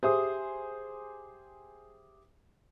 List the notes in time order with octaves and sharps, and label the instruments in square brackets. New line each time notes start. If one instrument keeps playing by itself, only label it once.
[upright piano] G4 E5 D#6 [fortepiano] G#4 C5